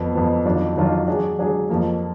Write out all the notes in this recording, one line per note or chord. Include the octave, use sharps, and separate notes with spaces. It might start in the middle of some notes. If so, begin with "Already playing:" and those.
Already playing: F2 F3 B3
F2 F3 B3
F2 D#3 F#3 D4 F4
F2 D#3 F#3 D4 F4
F#3 D4 G#4
F#3 D4 G#4
F2 F3 A#3